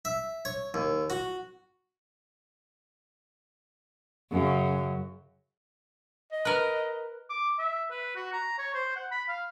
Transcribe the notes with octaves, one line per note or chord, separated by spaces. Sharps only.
E5
C#5
D#2
F#4
F#2 C#3
D#5
A#4 B4
D6
E5
B4
F#4
A#5
C#5
C5
F#5
B5
F5